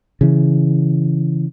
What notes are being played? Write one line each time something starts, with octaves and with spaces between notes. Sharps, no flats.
C#3 E3